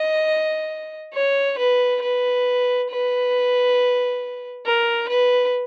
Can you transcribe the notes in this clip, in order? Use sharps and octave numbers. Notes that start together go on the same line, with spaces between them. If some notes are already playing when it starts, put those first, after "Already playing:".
Already playing: D#5
C#5
B4
B4
B4
A#4
B4